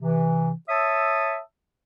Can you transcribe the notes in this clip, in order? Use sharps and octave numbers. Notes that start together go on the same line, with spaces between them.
C3 E3
C#5 E5 A5 D#6 E6